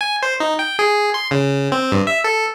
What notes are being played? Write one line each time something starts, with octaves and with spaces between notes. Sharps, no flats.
G#5
C5
D#4
G5
G#4
C6
C#3
C4
G2
E5
A4